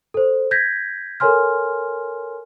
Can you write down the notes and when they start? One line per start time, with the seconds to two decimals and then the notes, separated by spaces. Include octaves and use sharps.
0.14 A4 C5
0.51 G6 G#6 A#6 B6
1.20 A4 A#4 C#5 G#5 C6 F6